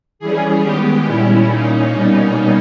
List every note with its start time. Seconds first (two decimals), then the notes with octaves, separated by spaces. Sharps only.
0.19 E3 G3 C#4 G#4
0.62 D#3 G#3 B3 G4
1.05 A#2 G3 C#4 E4
1.48 A#2 A#3 C#4 D#4
1.91 B2 G3 A#3 C#4 D#4